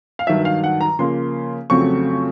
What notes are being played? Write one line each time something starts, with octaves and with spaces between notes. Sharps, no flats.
F5
G2 D#3 F#3 E5
F5
F#5
A#5
C#3 F3 A#3 C6
F2 C#3 F#3 A3 C4 C#6